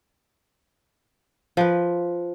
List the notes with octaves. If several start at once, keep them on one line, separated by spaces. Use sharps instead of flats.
F3 B4